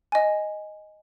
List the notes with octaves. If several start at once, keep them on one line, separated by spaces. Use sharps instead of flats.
D#5 G#5